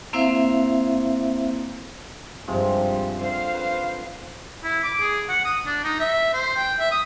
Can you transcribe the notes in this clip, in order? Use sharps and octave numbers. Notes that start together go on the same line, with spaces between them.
A#3 C4 E4 C5 E5 F5
G2 C3 F3 G#3
D3 C5 F5
B4
E4
D6
G#4
F#5
D#6
D4
D#4
E5
C5
G5
E5
D#6